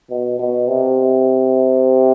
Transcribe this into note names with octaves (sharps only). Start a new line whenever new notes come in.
B2
B2
C3